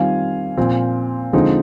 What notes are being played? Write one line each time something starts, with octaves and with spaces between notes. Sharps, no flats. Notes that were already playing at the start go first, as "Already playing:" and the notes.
Already playing: D#3 G3 C4 F4 F5 G#5
A#2 F3 C4
D3 F3 G#3 C4 D#4